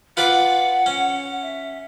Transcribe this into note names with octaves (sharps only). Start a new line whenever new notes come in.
F4 B4 D5 F#5
C#4
E5